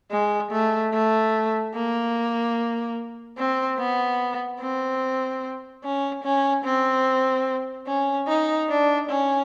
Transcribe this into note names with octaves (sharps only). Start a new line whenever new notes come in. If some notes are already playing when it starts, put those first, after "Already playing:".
G#3
A3
A3
A#3
C4
B3
C4
C#4
C#4
C4
C#4
D#4
D4
C#4